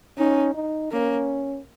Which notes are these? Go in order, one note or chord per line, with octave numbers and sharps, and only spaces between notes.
C#4 D#4
D#4
A#3 C#4